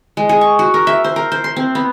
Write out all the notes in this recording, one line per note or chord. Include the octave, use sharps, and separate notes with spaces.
G#3
G#4
C#6
F#4
A#4
E5
C5
A#4
C5
C6
C4
B3